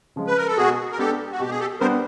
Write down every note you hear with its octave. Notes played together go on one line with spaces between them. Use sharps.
C#3 F3 G#3
B4
A#4
A4
B2 F#4 G#4
A#4
G#3 B3 D4 G4 A4
F#4
B2 G4
G#4
G4 A4
G3 B3 D4 A#4 C5